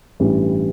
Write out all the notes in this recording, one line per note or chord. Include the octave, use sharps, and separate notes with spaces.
A1 G2 E3 G3